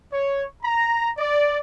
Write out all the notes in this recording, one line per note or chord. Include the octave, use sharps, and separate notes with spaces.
C#5
A#5
D5